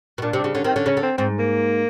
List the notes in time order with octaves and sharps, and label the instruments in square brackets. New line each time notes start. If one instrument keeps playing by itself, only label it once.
[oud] B2
[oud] A#2 [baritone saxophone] D4
[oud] C3
[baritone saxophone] D4
[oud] C#3
[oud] D3 [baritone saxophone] C#4
[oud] D#3 [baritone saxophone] C4
[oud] D3 [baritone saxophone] C#4
[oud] C#3 [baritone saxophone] C#4
[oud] D3
[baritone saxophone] C4
[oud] G#2 [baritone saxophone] C4
[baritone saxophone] A#3